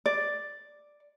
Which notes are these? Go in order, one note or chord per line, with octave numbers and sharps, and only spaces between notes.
D5